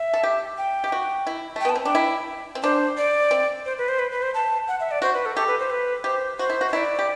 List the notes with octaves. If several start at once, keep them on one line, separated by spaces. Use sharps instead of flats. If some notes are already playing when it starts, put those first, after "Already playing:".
Already playing: E5
A4
G4
G5
G4
F#4
E4
A3 G5
B3 A5
C4
D4 G5
E4
C4
D4 C5
D5
C4
C5
B4
C5
B4
B4
C5
A5
F#5
E5
D5
F#4 C5
B4
A4
G4 A4
B4
C5
B4
G4 C5
F#4 C5
E4
F#4
C5
E4 D5
G4